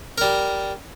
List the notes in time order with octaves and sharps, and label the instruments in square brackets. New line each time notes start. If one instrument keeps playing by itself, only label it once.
[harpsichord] G3 A#4